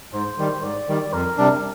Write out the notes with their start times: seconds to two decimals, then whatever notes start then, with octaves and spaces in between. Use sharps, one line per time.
0.13 G#2 C5
0.38 D#3 G3
0.63 G#2 D5
0.89 D#3 G3
1.13 F2 A#4
1.38 C3 G3 D4